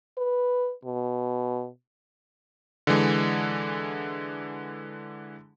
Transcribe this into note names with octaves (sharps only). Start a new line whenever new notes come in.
B4
B2
D3 E3 G#3